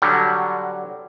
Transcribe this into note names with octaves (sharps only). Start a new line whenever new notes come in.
D3 F#3 G3